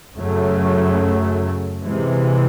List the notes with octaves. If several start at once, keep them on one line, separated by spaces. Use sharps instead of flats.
F#2 C#3 F#3 A3
C3 E3 G#3